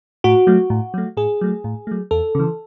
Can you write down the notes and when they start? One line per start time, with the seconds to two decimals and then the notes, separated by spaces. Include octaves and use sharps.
0.24 A2 F#4
0.47 F#3 A3
0.70 A2
0.94 F#3 A3
1.17 A2 G#4
1.41 F#3 A3
1.64 A2
1.87 F#3 A3
2.11 E2 A4
2.35 C#3 E3